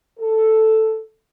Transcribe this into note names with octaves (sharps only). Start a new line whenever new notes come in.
A4